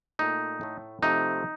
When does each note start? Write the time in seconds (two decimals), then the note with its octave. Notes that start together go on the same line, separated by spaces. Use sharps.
0.19 A#2 A3 D#4
0.61 A2 A3
1.02 C3 F3 A3 D#4